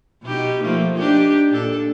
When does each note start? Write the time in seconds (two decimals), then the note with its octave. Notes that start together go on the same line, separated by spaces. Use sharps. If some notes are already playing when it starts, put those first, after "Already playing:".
0.23 B2 D#4 G4
0.62 F3 A3 A#3
0.96 D4 D#4 G4
1.49 A#2 D4 A4